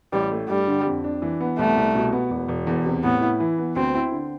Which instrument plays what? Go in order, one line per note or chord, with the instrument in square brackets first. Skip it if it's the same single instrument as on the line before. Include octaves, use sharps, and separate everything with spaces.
[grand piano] A1 [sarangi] G3
[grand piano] A3
[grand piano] G2 [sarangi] G3
[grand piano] D3
F2
D4
E3
B3
[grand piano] C2 [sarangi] A3
[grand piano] C2
B2
B3
E1
E1
E2
C3
[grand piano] A2 [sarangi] B3
[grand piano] E4
E3
B3
[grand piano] D2 [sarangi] C4
[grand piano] E4
D3